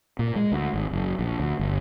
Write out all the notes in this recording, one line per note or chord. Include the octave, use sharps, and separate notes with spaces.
A#2
G#3
D2
G#1
F#1
A#1
D2
G1